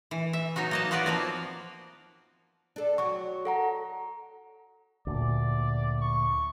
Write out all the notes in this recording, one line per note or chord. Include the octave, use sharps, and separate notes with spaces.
E3
E5
F#3 B3 D#4 F#4
A#3 D#5 A5
B3 F4 F#4 B4 D5
F3 A#3 C4
D4 A4
F#3 F#4 C#6
A4 F#5 A#5
D2 A#2 D5
C#6